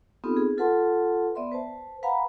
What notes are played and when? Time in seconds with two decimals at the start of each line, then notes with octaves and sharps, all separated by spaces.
0.24 B3 C4 D#4 F4 G4 A4
0.37 G#4
0.58 F4 A4 B4 F#5 A5 C6
1.35 B3 D5 E5 C6
1.52 B4 C5 A5
2.03 B4 F5 F#5 G#5 A#5 B5